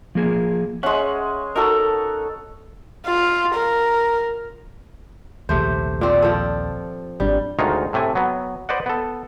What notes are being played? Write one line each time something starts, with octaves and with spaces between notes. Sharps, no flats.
F3 A#3 G#4
G#3 C#4 E5 F#5
D#4 F#4 A4 A#4
F4
A#4
A#1 D#2 C3 A3 C5
A#2 C4 D5
F3 A4
G#1 G3 D4
D2 D#3 G#3 D#4 F4 C#5
A2 C3 A3 G#5
F#3 B3
B4 C5 D5 D#5 F#5
B3 A4